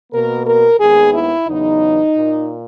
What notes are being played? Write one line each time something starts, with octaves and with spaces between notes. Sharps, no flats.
B2 A#3 A#4
A#4
D#2 D#3 G#3 B3 G#4
E4
E2 C#3 F#3 B3 D#4
A#2 A#3